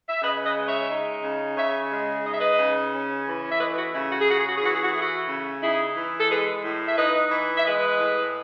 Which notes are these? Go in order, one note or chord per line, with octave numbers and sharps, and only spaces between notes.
E5
C#3 B4 D#5
B4 D#5
G#3
C#5 E5
D#4
C#3
C#3 C#5 E5
G#3
D#4 D#5
E5
B4 D#5
C#3
C#4
E3
E5
A3 B4 D#5
F#4
C#3 E4
F#4
G#4
C#4 F#4
G#4
F#4
G#4
E3 F#4
G#4
F#4
A3 G#4
F#4
C#3
D#4 E4 G#4
E3
A4
G#3 G#4 B4
A2
E5
D#4 B4 D#5
E3
E5
G#3 B4 D#5
A2